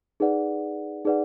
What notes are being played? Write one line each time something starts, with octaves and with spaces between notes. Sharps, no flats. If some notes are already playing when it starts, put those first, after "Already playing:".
D#4 G#4 B4 D5 F#5
D#4 G#4 B4 D5 F#5